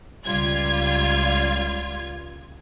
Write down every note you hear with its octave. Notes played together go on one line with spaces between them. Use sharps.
C#2 G3 F4 G#6